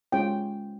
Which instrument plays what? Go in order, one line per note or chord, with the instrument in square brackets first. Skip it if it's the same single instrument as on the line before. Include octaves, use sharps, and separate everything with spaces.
[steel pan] G#3 C#4 F4 G5